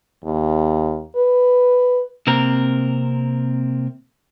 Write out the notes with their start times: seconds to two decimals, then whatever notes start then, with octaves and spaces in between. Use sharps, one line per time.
0.23 D#2
1.15 B4
2.27 C3 A#3 C4 A#4